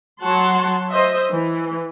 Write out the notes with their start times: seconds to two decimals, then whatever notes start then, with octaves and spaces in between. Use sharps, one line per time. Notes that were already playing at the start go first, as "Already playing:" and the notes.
0.24 F#3 C#5 F#5 A5 C6
0.92 C5 D#5 E5
1.31 E3